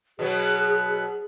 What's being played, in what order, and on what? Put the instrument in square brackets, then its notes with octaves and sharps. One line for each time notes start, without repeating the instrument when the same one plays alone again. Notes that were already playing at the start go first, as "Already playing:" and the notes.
[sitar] B2 F#3 B3 [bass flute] G#4